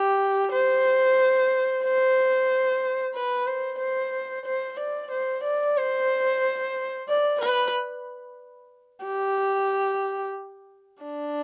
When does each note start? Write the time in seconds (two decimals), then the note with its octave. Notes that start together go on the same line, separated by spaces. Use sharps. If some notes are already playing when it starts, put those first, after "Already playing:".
Already playing: G4
0.52 C5
1.84 C5
3.15 B4
3.47 C5
3.80 C5
4.46 C5
4.79 D5
5.11 C5
5.44 D5
5.77 C5
7.09 D5
7.41 B4
9.05 G4
11.03 D4